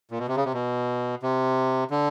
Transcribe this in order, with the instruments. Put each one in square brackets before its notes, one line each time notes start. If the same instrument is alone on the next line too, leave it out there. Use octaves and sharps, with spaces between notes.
[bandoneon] A#2
B2
C3
C#3
C3
B2
C3
D3